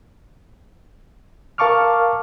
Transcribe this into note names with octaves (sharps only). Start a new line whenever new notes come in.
A#4 F5 A5 C#6 D6 F6